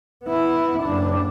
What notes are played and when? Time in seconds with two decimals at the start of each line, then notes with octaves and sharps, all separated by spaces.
0.24 B3 E4
0.83 F#1 D4